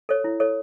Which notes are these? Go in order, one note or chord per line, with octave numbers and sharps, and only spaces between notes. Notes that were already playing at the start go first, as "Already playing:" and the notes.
A4 C#5
E4
A4 C#5